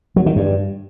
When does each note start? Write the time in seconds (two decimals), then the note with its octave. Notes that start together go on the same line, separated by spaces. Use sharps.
0.16 F#3
0.26 D#3
0.36 G2